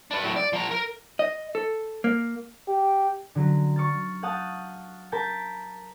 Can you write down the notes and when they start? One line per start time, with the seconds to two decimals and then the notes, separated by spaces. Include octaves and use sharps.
0.11 D4 B4
0.23 A2 F#3
0.36 D5
0.53 F3 A#5
0.71 A#4
1.19 D#5
1.55 A4
2.04 A#3
2.68 G4
3.35 D3 F#3
3.76 C#6 F6 A6
4.23 F5 F#5 A5 D#6 G6
5.12 A#4 A5 B5 G6